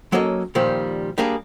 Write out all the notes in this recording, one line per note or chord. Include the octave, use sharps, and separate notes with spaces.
F#3 A#3 C#4 A4 D#5
A#2 D#3 F3 G3
G3 A#3 D4 G#4